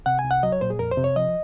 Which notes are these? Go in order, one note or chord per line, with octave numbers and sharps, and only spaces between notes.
C3 F#5
G#5
C2
F#5
F#3 D#5
C#5
A#2 C5
G#4
F2 A#4
C5
C3
C#5
F3 D#5